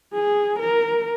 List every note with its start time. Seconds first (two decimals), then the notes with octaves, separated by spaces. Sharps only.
0.14 G#4
0.59 A#4